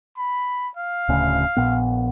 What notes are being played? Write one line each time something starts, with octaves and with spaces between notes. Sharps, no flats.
B5
F5
D1 D2 C#3
A#1 A#2 B3